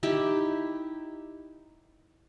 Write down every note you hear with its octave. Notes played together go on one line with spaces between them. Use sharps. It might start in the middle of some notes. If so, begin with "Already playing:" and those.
D#4 E4 G4